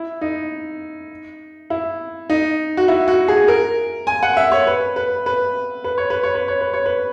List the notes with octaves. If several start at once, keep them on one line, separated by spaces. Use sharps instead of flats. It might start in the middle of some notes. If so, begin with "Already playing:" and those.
Already playing: E4
D#4
E4
D#4
F#4
E4
F#4
G#4
A#4
G#5
F#5
E5
C#5
B4
B4
B4
B4
C#5
B4
C#5
B4
C#5
B4
C#5
B4